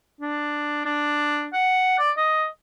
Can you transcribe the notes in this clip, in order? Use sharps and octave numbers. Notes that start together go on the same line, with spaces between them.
D4
D4
F#5
D5
D#5